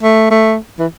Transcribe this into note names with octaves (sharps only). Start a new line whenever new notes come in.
A3
A3
E3